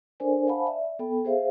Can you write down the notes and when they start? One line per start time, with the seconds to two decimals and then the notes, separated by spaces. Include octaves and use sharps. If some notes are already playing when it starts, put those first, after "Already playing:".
0.20 D4 A4 A#4 C5 D5 G#5
0.47 C5 F5 F#5 G#5 A5 B5
0.67 D5 E5
0.99 B3 A4 G5 B5
1.25 G#4 C5 E5 F5